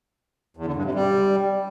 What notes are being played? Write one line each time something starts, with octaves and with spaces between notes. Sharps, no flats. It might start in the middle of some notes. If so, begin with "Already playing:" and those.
E2
D3
G2
C3
G3